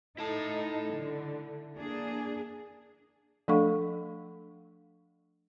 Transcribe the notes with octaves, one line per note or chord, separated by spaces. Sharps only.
D#4 E4 A4 A5
D3
A#3 D4 G#4
F3 A3 D4 A4 F5 C#6